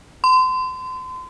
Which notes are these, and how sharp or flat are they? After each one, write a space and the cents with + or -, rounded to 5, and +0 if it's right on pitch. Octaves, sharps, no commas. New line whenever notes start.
C6 -35